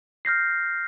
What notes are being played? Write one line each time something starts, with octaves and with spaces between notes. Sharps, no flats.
F6 G6 A#6 C7